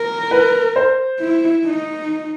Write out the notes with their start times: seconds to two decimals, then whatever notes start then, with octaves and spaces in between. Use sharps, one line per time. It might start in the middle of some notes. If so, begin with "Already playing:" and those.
Already playing: A#4
0.31 B4
0.76 C5
1.19 E4
1.65 D#4